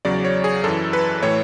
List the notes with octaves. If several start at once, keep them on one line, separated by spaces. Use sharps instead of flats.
E2 C#3 F#3 D5
C#5
G#4
F#2 E3 A4
B4
A2 E3 C#5